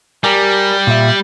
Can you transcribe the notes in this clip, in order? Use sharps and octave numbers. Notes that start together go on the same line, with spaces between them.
G3 G4 A#4 G#5
A#2 E5